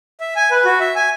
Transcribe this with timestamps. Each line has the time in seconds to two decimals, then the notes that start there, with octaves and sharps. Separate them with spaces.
0.20 E5
0.36 G#5
0.51 B4
0.65 F#4
0.80 E5
0.96 G#5